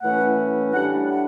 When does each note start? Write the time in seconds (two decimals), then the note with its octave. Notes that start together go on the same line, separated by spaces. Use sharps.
0.02 A2 E3 A3 C#4 F#5
0.73 A2 G3 D4 F#5
1.08 F#5